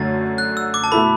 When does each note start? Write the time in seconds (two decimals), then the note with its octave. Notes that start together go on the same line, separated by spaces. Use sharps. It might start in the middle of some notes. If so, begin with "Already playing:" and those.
Already playing: F#2 D3 A3 A6
0.38 F#6
0.57 E6
0.74 D6
0.84 A5
0.92 B2 A3 E4 A4 B5